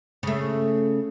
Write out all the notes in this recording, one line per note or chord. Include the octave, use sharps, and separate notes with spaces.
C#3 A3